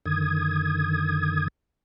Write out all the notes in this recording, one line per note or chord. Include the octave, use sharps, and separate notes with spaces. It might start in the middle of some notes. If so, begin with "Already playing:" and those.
F#2 D3 D#3 D#6 G#6